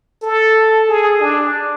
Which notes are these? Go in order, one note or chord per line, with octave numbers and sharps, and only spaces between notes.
A4
G#4
D4